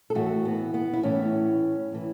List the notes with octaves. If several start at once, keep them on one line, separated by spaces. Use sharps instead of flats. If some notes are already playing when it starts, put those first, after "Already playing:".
A4
A2 E3 F#4
B3
B3
E4
A2 E3 C#4
A2 E3